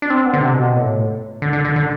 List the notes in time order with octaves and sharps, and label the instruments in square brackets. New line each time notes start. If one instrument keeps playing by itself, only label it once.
[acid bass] D4
C4
B3
D3
C3
B2
A2
D3
D3
D3
D3